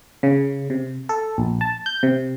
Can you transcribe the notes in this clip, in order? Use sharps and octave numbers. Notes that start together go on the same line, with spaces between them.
C#3
C3
A4
A#1
A5
G6
C3